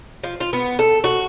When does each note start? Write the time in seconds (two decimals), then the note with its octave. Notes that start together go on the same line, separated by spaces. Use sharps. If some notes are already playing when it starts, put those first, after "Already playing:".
0.23 F3
0.40 F4
0.53 B3
0.79 A4
1.04 F#4